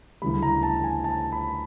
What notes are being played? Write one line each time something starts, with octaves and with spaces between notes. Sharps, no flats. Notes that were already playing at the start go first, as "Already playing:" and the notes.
D2 C#3 E3 G3 B5
A#5
A5
G#5
A5
B5